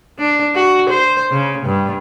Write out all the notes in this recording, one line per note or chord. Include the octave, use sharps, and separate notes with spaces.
D4
F#4
C5
C#3
G2